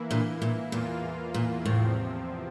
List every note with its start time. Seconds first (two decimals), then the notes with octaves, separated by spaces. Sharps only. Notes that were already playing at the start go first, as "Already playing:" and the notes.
Already playing: E3 A#3 E4
0.11 A#2 D3
0.42 A#2
0.72 E2 A#2 E3 A#3 F4
1.34 A#2
1.65 E2 A2 C3 F3 C4